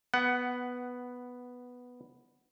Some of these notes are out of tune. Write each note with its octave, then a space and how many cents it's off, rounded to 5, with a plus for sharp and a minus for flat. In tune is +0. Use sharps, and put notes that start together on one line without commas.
B3 +0 F#5 +15